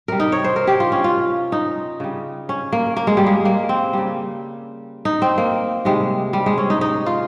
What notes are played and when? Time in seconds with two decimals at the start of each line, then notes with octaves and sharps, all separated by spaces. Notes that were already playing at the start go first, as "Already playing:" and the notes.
0.08 C3 G3 A#4
0.20 D#4
0.32 C#5
0.44 C5
0.56 A#4
0.67 G4
0.80 F4
0.92 C#4
1.04 F4
1.52 D#4
2.00 C#3 G3
2.49 C#4
2.73 A#3
2.97 A#3
3.07 G#3
3.17 G3
3.26 G#3
3.45 A#3
3.69 C4
3.93 C#3 G3
5.05 D#4
5.22 C4
5.38 A#3
5.85 C3 D#3 G3 G#3
6.33 G3
6.46 G#3
6.58 C#4
6.70 D#4
6.81 D#4
7.06 F4